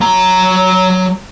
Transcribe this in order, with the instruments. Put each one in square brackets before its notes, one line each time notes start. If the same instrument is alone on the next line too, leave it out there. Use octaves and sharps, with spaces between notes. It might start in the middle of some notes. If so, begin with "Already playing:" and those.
[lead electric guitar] F#3 A#5